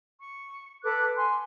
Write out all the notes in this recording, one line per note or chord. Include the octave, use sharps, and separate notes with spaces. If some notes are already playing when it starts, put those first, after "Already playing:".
C#6
A4 B4 D6 F#6
G#5 C6